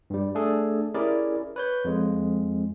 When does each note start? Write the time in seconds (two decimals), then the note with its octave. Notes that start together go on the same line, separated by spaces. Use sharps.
0.10 G2 G3
0.35 A3 D4 G#4 A4
0.95 C#4 E4 G4 G#4 A#4 D5
1.56 B4 C#5 G6
1.85 F2 G#3